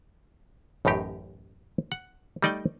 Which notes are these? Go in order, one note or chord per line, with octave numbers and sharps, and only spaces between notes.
A1 F#2 A2 D#4 G4
F#5
G3 A3 D#4 D5 D#5 G5